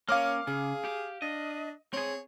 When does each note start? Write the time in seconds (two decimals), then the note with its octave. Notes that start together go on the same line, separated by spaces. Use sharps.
0.09 A#3 C#4 C#5 F5 D6 F6
0.47 C#3 G#4
0.85 G4
1.22 D4 D#5
1.93 C4 G#4 C#5